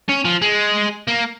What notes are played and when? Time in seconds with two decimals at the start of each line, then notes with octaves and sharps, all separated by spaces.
0.09 C#4
0.25 F3
0.42 G#3
1.08 A#3